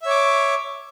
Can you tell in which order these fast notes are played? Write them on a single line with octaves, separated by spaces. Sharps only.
E5 C#5 D6